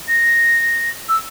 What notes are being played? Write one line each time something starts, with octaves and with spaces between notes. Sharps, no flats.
A#6
E6